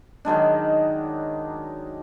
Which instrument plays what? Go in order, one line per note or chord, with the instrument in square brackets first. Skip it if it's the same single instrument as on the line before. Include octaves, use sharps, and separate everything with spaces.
[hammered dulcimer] D#3 F#3 G#3 D4